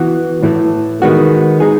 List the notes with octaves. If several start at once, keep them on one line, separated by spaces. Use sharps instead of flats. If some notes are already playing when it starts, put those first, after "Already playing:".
Already playing: E3 B3 F#4
A2 E3 A3
D#3 G#3 B3 F#4
G#3 D#4 G#4